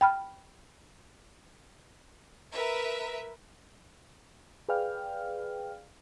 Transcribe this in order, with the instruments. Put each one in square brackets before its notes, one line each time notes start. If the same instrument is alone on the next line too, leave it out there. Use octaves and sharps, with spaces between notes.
[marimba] G5 B5 F6
[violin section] A#4 B4 E5
[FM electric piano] G#4 B4 D5 F5 G5 F6